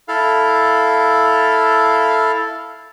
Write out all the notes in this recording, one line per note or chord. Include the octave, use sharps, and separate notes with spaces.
E4 A4 F5